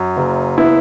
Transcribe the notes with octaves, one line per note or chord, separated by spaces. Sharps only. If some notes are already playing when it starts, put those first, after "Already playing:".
Already playing: F#2
F#1
B3 E4